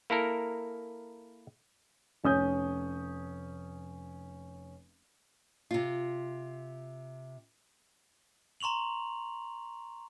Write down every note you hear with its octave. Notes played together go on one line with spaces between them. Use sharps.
A#3 E4 A4 A#4
F1 C#4 D#6 G6
C3 F4
A#5 C6 C#6 F7 F#7